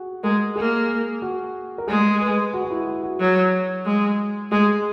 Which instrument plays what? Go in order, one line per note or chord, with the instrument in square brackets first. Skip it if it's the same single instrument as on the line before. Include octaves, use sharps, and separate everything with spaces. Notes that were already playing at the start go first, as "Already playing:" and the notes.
Already playing: [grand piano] F#4 G#4
[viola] G#3 [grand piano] A#4
[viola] A#3 [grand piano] G#4
[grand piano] F#4
A#4
[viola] G#3 [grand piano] G#4
[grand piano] B4
F#4
F#4
E4
F#4
F#4
[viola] F#3
G#3
[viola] G#3 [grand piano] G#4